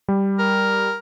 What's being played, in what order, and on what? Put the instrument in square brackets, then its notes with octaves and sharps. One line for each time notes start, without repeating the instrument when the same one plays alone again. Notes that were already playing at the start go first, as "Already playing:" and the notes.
[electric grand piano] G3
[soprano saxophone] A#4